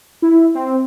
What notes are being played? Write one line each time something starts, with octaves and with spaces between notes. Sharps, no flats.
E4
C4